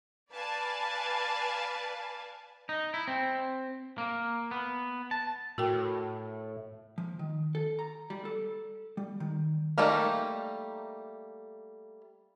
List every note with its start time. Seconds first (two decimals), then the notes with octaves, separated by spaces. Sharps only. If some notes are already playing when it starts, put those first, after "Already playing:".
0.33 B4 D5 F5 G#5 A5
2.69 D#4
2.94 E4
3.08 C4
3.98 A#3
4.51 B3
5.11 A5
5.58 A2 F#4 A#4 G5
6.98 F3
7.19 D#3
7.55 A4
7.79 A#5
8.10 G3
8.25 A4
8.97 G3
9.20 D#3
9.78 G3 A3 A#3 D#4 A#4